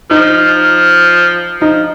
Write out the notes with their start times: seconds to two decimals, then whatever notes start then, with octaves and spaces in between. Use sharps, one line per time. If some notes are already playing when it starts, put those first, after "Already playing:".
0.10 F3 D#4
1.61 F3 D#4